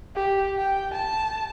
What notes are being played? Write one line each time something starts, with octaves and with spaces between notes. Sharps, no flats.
G4
G5
A5